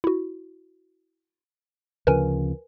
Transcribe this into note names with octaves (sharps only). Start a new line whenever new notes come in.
E4 F#4
D2 C#3 F3 A#4 B4 G#5